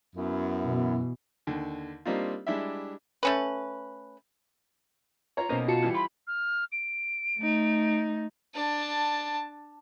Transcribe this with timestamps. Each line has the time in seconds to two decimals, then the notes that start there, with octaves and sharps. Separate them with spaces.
0.16 F#2 B3 E4
0.63 B2 E3
1.47 D#2 D3
2.05 G3 A#3 C4 D4 D#4 F4
2.47 G3 G#3 D4 E4 G4 E5
3.23 A3 C#4 B4
5.37 F4 C#5 A#5
5.49 B2 A#3 C#4 D#4 C5
5.68 F4 F#4 A5 C#7
5.83 E3 G3
5.94 F4 B5
6.27 F6
6.72 D7
7.39 A3 D#4
8.54 D4 A5